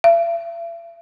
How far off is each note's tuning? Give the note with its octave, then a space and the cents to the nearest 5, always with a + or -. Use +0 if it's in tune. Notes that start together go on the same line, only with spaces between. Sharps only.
E5 +40